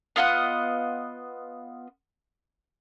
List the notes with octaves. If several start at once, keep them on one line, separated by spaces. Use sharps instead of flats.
B3 F4 D#5 F#5